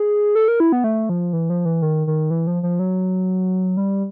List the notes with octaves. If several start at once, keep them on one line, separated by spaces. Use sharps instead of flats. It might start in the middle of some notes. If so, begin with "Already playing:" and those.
Already playing: G#4
A4
A#4
E4
B3
A3
F3
E3
F3
E3
D#3
D#3
E3
F3
F3
F#3
G3